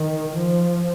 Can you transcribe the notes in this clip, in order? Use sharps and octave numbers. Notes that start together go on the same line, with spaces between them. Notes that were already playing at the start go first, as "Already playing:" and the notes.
Already playing: D#3
F3